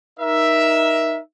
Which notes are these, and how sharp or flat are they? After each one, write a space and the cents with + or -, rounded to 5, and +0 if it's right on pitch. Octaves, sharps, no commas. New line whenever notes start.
D#4 +0 A#4 +25 E5 +0